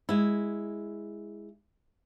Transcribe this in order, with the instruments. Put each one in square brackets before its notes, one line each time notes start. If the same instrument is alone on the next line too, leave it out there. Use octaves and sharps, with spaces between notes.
[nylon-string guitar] G#3 E4